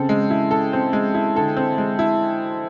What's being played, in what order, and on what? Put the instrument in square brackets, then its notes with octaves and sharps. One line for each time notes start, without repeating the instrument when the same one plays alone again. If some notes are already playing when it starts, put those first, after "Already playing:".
Already playing: [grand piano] C#3 [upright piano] C4 A4
[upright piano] G#3
E4
A4
C4
G#3
E4
[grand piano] D3 [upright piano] A4
[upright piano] C4
G#3
E4